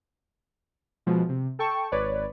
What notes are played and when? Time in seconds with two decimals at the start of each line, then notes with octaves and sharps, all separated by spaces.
1.06 B2 F3 G#3
1.29 C3
1.59 A4 G5 A5 C#6
1.92 G#1 B4 C#5 D5